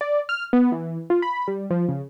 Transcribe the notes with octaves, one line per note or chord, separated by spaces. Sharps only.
D5
F6
B3
E3
F4
B5
G3
F3
C#3